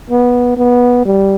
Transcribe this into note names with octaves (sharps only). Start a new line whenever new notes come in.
B3
B3
G3